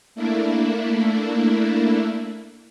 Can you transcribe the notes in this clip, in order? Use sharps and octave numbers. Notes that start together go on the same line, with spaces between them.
A3 A#3 D4 E4